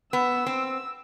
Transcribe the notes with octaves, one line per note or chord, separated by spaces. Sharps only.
B3 E6
C4